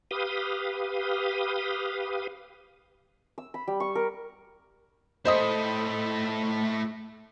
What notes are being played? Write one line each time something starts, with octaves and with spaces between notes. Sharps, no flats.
G4 B4 F5 D#6
E6
B5
G3
C#6
A#4
A3 E4 C5 D#5 D#6